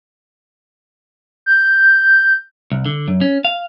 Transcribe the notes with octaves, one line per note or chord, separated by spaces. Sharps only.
G6
C2
D3
F#2
C#4
F5